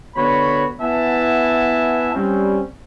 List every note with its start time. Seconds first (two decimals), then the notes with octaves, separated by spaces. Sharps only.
0.16 D3 B3 F#4 C#5 B5
0.81 B3 E4 E5 F#5 G#5 A5
2.14 G3 C4 C#4